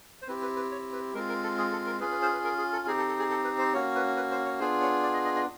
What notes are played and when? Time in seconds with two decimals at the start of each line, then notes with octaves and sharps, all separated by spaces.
0.22 C5
0.28 C4 E4 G4 B4
0.42 B4
0.56 B4
0.71 C#5
0.93 B4
1.14 G#3 C4 F4 A#4
1.29 A#4
1.43 A4
1.58 G#4
1.72 A4
1.86 A#4
2.00 C#4 F4 G#4 B4
2.11 B4
2.22 C5
2.33 B4
2.44 A#4
2.58 G#4
2.73 A4
2.87 C4 D#4 G4 G#4
2.98 A4
3.09 A4
3.19 G#4
3.30 A4
3.44 B4
3.59 C5
3.73 A#3 C#4 F#4 C#5
3.95 B4
4.17 B4
4.31 C5
4.45 C#5
4.60 B3 D4 F4 G#4 C5
4.82 C#5
5.03 D5
5.14 D#5
5.25 D#5
5.35 D#5